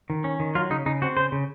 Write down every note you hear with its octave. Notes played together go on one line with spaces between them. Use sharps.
D#3
C#4
D#3
F#3 F4
C#3 D#4
C#3 D#4
C4 F#4
C#3 C5
C#3